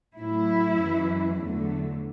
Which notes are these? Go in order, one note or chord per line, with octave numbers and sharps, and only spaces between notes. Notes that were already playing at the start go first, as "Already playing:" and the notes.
A2 F#3 E4
F#2 E3 G#3
E2 D3 F#3 A3